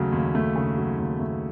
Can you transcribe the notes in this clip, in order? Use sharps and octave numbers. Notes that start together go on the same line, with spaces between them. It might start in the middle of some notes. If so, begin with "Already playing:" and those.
Already playing: D#2 C#3 F#3 A3
D#2
A3
C#3
F#3
D#2
A3